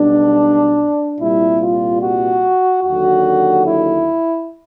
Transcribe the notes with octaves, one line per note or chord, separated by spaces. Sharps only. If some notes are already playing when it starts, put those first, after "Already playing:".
Already playing: B1 B2 G3 D4
C2 A#2 G3 E4
F4
F#4
D#2 D3 F#3 F#4
E4